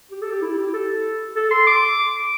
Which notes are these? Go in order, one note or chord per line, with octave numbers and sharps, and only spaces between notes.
G4
A4
G4
E4
G4
A4
A4
C6
D6